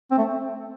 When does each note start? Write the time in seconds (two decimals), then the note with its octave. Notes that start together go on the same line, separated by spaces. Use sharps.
0.11 C4
0.18 A3